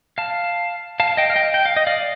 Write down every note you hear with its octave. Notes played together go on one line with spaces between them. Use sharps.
F5 A5
F5 A5
D#5 G5
F5
D#5 G5
G5
F5
D#5
D5 F5